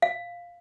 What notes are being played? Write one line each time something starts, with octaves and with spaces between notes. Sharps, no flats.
F5